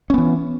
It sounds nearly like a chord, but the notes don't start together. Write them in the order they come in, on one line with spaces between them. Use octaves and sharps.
C#4 B3 E3